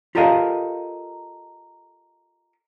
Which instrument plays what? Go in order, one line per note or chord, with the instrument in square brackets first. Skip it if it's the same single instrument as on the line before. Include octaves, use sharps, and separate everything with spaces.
[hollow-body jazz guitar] F4 G4 A4 A#4 D#5 F5